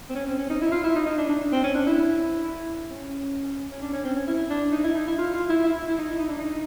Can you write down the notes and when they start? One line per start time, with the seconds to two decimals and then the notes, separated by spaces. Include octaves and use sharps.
0.10 C4
0.15 C#4
0.26 C4
0.38 C#4
0.49 D#4
0.61 E4
0.72 F4
0.84 E4
0.95 D#4
1.06 D#4
1.17 D4
1.29 D4
1.52 C4
1.63 C#4
1.75 D4
1.87 E4
2.90 C#4
3.70 C#4
3.81 D4
3.93 C#4
4.04 C4
4.16 C#4
4.27 E4
4.50 D4
4.72 D#4
4.84 E4
4.95 D#4
5.07 E4
5.18 F4
5.34 F4
5.49 E4
5.64 E4
5.87 E4
5.98 D#4
6.10 E4
6.19 D#4
6.28 D4
6.38 D#4